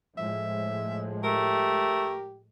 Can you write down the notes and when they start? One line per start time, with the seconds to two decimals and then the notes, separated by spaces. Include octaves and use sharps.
0.18 A2 F3 G#3 E5
1.24 A3 G4 A#4